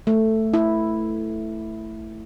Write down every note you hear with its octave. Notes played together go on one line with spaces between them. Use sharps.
A3
E4